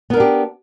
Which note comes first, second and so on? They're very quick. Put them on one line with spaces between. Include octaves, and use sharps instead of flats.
B3 A#4 D4 G4